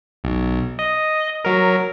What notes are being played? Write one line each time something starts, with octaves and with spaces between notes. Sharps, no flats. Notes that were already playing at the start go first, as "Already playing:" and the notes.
B1
D#5
F#3 A#4